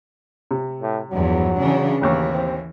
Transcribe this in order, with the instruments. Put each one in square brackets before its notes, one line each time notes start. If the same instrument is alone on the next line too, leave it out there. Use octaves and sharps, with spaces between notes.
[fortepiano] C3
[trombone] A2
[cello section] E2 G2 F3 [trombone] F#3
[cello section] C#3 E3 D4
[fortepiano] A1 D#2 C#6 [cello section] E3
[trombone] C4